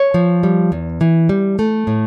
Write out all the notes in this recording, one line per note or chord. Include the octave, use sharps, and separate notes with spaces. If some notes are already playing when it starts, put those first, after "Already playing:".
Already playing: C#5
F3
G3
E2
E3
G3
A3
A2